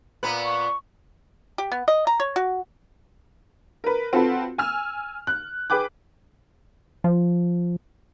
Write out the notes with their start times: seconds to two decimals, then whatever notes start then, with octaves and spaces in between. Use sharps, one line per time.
0.23 A#2 B3 B4
0.45 C#6
1.58 G4
1.72 B3
1.88 D#5
2.07 A#5
2.20 C#5
2.36 F#4
3.84 A#4 B4
4.13 C4 F4 F#4 A4 B4
4.58 G#5 E6 F6
5.27 F#6
5.70 G#4 B4 G5 D6 F#6
7.04 F3